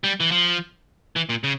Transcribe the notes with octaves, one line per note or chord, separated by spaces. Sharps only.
G3
E3
F3
E3
A#2
C#3